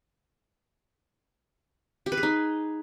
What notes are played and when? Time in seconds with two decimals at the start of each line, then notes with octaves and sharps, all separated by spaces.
2.06 G4
2.12 B4
2.17 G#4
2.23 D#4